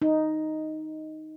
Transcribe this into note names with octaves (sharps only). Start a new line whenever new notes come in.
D#4